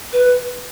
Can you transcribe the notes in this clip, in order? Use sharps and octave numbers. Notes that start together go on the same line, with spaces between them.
B4